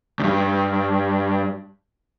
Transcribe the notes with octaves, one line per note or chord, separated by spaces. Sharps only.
D2 G2